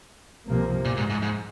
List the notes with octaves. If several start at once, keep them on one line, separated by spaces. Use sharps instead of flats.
C2 C3 F3 A#3
A#2
G#2
G#2
G#2